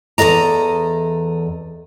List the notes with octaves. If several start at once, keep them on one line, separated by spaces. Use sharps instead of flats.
E2 C3 A4 D#5 A#5